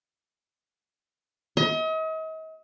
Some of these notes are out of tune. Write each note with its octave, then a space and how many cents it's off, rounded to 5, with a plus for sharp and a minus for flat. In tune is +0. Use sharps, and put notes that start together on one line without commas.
D#5 +40